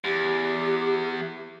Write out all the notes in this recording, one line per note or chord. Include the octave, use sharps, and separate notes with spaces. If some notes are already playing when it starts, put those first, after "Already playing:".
E2 G4